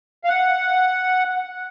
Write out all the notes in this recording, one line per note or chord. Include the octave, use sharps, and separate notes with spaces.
F5
F#5